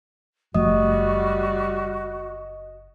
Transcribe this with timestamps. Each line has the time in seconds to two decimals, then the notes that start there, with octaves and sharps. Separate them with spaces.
0.54 F#1 F3 G3 A3 F#4 D#5 D#6